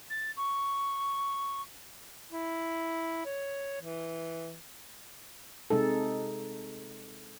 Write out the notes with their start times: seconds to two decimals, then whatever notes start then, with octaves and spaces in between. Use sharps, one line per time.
0.10 A6
0.37 C#6
2.31 E4
3.25 C#5
3.82 E3
5.70 C3 G#3 D#4 A4